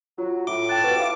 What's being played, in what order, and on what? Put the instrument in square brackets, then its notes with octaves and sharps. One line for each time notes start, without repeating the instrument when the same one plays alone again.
[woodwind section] F#3 [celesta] F4
[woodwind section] A2 [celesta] F4 G7 [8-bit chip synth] D6
[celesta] G5 F#6 [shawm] A5
[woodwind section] C4 F#4 G4 [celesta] B4
[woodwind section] E4 F4 [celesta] F5